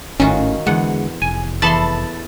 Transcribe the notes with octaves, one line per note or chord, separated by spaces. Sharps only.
G#1 A2 D#3 C#4 F4 F#4
E2 D3 G#3 F#5
F1 G#5
E2 A4 A5 B5 C6 A6